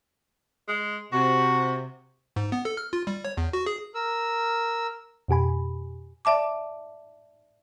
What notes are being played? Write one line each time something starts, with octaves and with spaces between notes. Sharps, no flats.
G#3
C3 F#4
G#2
B3
A4
F6
F4
G3
C#5
E2
F#4
G#4
A#4 E6
F2 B2 G4 G#5 B5
D5 E5 A5 D6